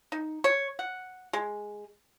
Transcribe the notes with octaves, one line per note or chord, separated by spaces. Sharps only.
D#4
C#5
F#5
G#3